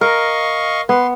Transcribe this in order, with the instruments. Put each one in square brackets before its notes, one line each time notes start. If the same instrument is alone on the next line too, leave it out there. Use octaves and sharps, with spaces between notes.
[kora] A#4 [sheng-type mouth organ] D#5 F5 C#6
[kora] B3 [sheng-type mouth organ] B4 C6